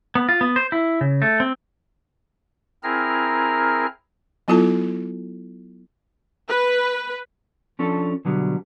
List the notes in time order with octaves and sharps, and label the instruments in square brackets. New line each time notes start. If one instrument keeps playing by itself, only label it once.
[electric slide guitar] B3
F4
B3
C5
E4
C#3
A3
C4
[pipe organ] C4 E4 G#4 A#4 A#5 F6
[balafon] F#3 B3 E4 F4 A4 A5
[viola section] B4
[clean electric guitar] F3 C#4 D4 A4
B2 D3 F#3 G3